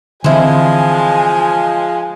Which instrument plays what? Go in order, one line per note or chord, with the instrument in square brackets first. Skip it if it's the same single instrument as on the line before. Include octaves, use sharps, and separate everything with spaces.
[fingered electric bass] D3 E3 C4 [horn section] F3 G#3 [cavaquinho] E4 C5 [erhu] G#5